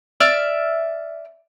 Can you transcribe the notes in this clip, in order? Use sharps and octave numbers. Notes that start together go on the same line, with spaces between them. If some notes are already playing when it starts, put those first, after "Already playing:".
D5 E5 F6